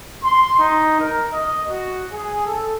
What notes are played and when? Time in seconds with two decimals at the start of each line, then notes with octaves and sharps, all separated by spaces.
0.22 C6
0.57 D#4
0.98 A#4
1.32 D#5
1.68 F#4
2.12 G#4
2.45 A4